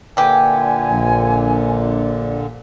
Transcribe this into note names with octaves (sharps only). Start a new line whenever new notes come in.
A#2 D3 E3 G4 G#5
A#1